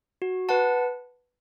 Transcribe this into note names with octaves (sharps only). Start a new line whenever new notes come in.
F#4
B4 F#5 A5